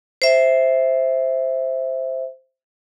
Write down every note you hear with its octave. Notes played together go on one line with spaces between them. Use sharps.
C5 E5